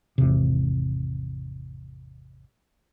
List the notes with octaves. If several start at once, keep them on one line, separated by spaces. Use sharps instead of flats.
G#1 E2 C3